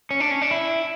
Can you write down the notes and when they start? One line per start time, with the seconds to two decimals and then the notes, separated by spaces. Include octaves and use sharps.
0.11 C#4
0.20 D4
0.31 C#4
0.42 D4
0.51 E4